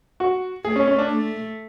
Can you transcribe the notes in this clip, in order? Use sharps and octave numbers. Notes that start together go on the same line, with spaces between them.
F#4
A3 G#4
C#4
C#4
D4
A3